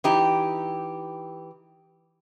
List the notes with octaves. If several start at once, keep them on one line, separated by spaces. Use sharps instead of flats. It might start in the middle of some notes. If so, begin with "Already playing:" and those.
E3 D#4 G4